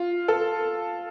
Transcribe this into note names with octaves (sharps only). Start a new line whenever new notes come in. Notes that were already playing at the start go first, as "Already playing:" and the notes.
Already playing: F4
A4